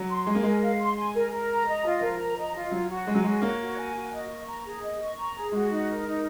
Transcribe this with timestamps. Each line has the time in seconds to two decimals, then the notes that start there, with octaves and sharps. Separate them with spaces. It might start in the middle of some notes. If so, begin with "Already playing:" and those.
Already playing: F#3
0.09 C6
0.26 G#3 G#5
0.35 A#3
0.43 G#3 A#4
0.62 F5
0.79 C6
0.96 G#5
1.14 A#4
1.31 A#4
1.49 A#5
1.67 D#5
1.84 F4
2.01 F3 A#4
2.19 A#5
2.37 D#5
2.54 F4
2.71 F#3 C#5
2.89 F#4
3.07 G#3 G#5
3.15 F#3
3.24 G#3 F#4
3.41 A#3 C#5
3.59 F#4
3.77 G#5
3.94 F#4
4.12 D#5
4.29 C#6
4.47 A#5
4.65 G#4
4.82 D#5
4.99 C#6
5.17 A#5
5.34 G#4
5.52 G#3 F#4
5.69 D#4
5.87 A#4
6.04 D#4